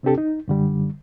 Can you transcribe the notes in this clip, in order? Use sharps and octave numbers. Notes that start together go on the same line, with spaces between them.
C3 C4 D4 G4 A4
D#4
F#2 D3 G3